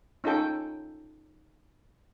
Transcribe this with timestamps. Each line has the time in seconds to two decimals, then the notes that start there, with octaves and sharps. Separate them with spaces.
0.24 C#4 D#4 F4 A4 G5